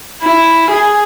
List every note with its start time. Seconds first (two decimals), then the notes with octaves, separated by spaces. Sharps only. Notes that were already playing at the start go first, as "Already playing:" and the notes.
0.22 E4
0.71 G#4